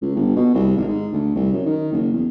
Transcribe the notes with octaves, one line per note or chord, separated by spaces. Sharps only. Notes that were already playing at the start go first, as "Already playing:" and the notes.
C#2
G1
B2
C2
G#1
G#2
D2
C2
F#2
D#3
F#1
E2